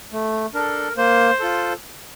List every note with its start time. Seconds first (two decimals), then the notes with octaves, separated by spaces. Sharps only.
0.13 A3
0.54 D4 A4 A#4
0.97 A#3 C5
1.40 F4 A4